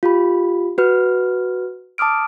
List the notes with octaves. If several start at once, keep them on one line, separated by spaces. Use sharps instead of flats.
F4 G4 B5
F#4 B4 F6
A5 D6 D#6 F6 D7